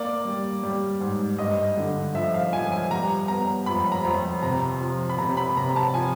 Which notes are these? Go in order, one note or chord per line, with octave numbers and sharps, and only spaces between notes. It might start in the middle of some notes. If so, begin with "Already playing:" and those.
Already playing: A#3 D5
G3
G3
G#2
G2 D#5
D3
F3 E5
F5
F3 G#5
G#5
G3 A#5
B3 A#5
F2 B5
A#5
F2
C3 A#5
F3
B5
C3 A#5
B5
C3 A#5
A5
F3 G#5